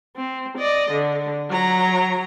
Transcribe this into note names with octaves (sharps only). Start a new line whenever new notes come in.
C4
D5 D#5
D3
F#3 A#5